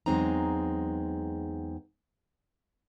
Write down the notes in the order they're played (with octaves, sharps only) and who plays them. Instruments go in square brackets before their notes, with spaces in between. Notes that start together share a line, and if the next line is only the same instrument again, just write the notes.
[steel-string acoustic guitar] E2 F#3 G#3 C4 D#4 A#5